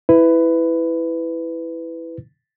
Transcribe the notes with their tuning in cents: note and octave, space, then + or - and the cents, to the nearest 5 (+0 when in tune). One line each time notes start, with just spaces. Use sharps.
E4 +0 B4 +15